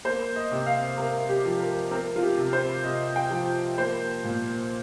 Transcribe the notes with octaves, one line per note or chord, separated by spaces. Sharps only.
A#3 C5
D#5
C3
F5
C3 A#4
G4
F3
A#4
C4 A#4
F4
G4
C3
C5
C3 D#5
G5
F3
A#3 C5
A#2